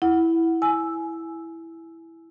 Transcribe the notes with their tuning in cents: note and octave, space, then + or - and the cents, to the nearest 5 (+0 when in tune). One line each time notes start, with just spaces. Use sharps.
E4 +0 F#5 +0
G#5 +15 E6 +0